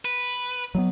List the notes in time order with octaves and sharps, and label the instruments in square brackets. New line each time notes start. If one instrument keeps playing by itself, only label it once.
[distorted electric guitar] B4
[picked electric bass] F#3 G#3 B3